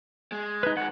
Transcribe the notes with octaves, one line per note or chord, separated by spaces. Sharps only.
G#3
D#4 B4
D#3 G#3 F#5